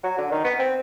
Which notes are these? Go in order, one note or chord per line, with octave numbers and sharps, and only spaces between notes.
F#3
D3
D#3
B3
C4